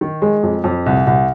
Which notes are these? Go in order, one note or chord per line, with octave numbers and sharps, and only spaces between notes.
D#3
G#3
F2
F2
C2
C2